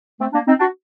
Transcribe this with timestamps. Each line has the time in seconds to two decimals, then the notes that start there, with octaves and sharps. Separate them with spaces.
0.20 A3 C4
0.32 A#3 D4
0.46 C4 D#4
0.58 D4 F#4